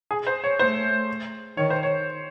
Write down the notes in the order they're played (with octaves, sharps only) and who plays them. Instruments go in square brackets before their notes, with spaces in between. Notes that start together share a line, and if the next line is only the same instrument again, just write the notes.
[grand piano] G#4
C5
C#5
[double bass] A3 [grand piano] C5
[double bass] D#3 [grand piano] C#5
[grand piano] C5
C#5